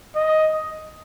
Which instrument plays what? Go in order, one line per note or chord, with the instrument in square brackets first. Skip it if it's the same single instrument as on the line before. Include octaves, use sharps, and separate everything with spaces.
[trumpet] D#5